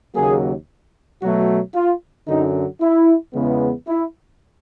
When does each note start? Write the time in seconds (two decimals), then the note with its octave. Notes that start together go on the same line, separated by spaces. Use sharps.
0.15 D#2 C#3 F#3 A#3 G#4
1.22 B2 F#3 A3 F#4
1.75 F4
2.27 F#2 D3 F#3 D#4
2.81 E4
3.33 E2 C#3 E3 G#3 B3
3.87 E4